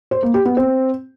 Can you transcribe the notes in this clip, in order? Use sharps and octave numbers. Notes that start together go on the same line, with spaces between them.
C5
A#3
G4
B3
C4